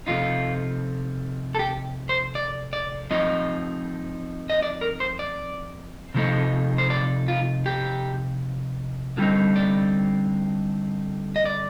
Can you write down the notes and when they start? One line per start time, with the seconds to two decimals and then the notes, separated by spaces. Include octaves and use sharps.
0.07 C3 F3 A3 D#4 F4
1.55 A4
1.59 G4
2.09 C5
2.35 D5
2.73 D5
3.11 F3 C4 D#4 D#5
4.50 D#5
4.62 D5
4.81 A#4
5.00 C5
5.19 D5
6.14 C3 F3 A3 D#4
6.78 C5
6.90 D5
7.28 F4
7.66 G4
9.17 D3 G3 C4 D#4 F4
9.56 D5
11.36 D#5
11.45 D5